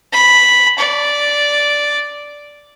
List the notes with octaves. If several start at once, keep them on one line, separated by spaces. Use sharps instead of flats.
B5
D5